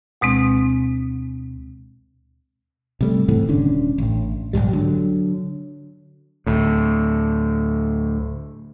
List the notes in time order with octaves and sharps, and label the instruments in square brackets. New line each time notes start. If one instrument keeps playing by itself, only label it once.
[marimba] D2 B2 G#3 C4
[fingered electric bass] C3 G3 A3
G#2 C3 E3 A3
D#1 D3 C#4 D4
A1 A2
A#1 E2 G#2 G3
D3 F#3
[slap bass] D2 A2